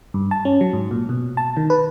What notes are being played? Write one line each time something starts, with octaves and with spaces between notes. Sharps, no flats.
G2
A5
C#4
F#3
G#2
A#2
B2
A5
D#3
B4